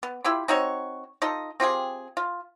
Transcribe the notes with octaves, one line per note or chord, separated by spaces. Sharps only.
B3
E4 F4 G4 B5
C4 D#4 F#4 C#5
D#4 F4 A4 D#5
C4 F4 G4 G#4
F4